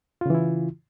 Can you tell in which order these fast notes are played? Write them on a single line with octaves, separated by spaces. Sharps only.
F4 C#3 E3 E4